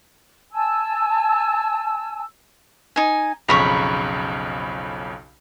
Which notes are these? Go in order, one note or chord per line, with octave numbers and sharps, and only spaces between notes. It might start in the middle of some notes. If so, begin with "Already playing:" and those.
G#5 A5 E6
D#4 G#5
B1 F2 C#3 A#5 B5 C#6